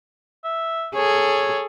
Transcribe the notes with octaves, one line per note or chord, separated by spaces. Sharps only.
E5
G#4 A4 C#5